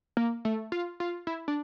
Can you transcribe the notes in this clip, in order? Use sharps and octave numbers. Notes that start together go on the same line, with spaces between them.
A#3
A3
F4
F4
E4
D4